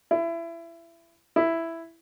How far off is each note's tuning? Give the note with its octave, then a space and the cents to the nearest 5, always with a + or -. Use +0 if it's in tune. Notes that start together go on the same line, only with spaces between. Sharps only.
E4 +25
E4 +5